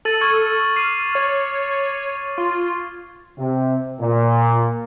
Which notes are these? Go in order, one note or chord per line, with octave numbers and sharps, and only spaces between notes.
A4 A6 D#7 F#7
C#6 F6 G#6
D6 F6 C7 D#7
C#5
F4
C3
A#2